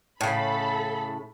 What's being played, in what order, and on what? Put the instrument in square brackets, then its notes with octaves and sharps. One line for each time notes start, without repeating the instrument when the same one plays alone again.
[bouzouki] A2 C#3 [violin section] A4 B5